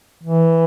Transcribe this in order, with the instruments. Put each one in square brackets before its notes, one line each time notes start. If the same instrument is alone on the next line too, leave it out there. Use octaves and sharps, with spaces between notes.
[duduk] E3